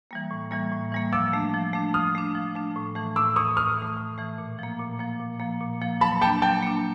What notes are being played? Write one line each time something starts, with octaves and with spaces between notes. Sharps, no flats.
E3 G3 A#3
A2
E3 G3 A#3
A2
E3 G3 A#3
F3 D6 E6
A3 D4
F3
A3 D4
F3 D#6 F6
A3 D4
F3
A3 D4
A2
E3 A3
A2 D6 E6
E3 A3 C#6 D#6
A2 D#6 F6
E3 A3
A2
E3 A3
A#2
F3 A#3
A#2
F3 A#3
A#2
F3 A#3
A#2
F3 A#3
F#3 A5 B5
A#3 D4 G5 A5
F#3 G5 A5
A#3 D4